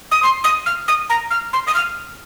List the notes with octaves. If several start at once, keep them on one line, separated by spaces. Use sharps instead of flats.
D#6
C6
D#6
F6
D#6
A#5
F6
C6
D#6
F6